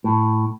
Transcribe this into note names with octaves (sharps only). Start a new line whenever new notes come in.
A2